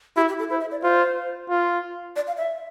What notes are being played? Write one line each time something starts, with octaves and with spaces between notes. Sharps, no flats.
E4 G4
G4
A4
E4 C5
E5
D5
F4 C5
F4
D5
F5
E5